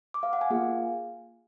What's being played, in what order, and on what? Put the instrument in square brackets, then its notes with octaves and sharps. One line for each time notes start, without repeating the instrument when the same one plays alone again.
[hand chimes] D6
F5
F#5
G#5
A#3 F4 G#4 F5